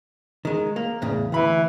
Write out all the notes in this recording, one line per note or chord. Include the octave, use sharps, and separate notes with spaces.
D#3 G#3
A#3
E2 A2 C#3
D2 E3 B5